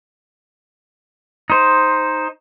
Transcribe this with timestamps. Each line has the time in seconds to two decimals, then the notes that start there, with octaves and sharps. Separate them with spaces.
1.50 D#4 C5